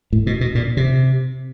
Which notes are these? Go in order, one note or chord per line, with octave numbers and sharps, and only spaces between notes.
A2
B2
B2
A#2
C3